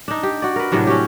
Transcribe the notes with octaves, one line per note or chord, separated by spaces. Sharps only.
D4 D#4
G4
F#4 D5
A#4 B4
A2 C3 F#3 D4
C#4 F#4 G4